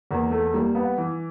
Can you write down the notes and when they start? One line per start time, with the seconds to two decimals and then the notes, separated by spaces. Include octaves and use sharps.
0.11 E2 A#3
0.31 A3
0.53 G3 A#3
0.75 B3
0.98 E3